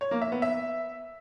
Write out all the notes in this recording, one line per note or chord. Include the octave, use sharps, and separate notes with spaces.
C#5
A#3
E5
B3
E5